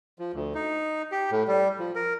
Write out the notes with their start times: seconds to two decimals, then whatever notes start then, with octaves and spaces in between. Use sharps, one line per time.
0.19 F3
0.33 D2
0.55 D#4
1.12 G4
1.31 A2
1.48 G3
1.79 F3
1.95 A#4